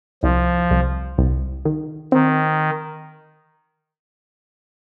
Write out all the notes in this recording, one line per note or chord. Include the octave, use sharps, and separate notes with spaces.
C2 F3
C2
C2
D#3
D#3 C4